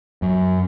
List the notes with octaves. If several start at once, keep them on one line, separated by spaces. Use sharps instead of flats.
F#2